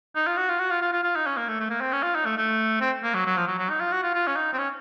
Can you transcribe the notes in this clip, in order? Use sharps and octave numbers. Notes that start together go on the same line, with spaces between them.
D#4
F4
F#4
F4
F#4
F4
F4
F4
F4
D#4
C#4
A#3
A3
A3
A#3
C4
C#4
F4
D#4
A3
A3
C4
A#3
F#3
F#3
F3
F#3
F#3
D#4
F4
F#4
F4
F4
C#4
D#4
C4
C#4